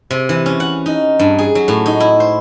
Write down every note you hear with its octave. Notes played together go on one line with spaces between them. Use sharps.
C3
E3
C#4
F#5
D#4
G2
G#4
F#3
A2
D#4
E4
C5